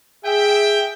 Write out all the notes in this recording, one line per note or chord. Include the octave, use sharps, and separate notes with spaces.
G#4 E5 G5